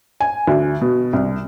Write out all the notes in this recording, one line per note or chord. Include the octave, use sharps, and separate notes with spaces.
G#5
D2
B2
C2